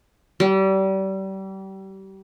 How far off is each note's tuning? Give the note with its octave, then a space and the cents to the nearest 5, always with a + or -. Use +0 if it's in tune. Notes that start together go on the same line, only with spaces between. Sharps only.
G3 -30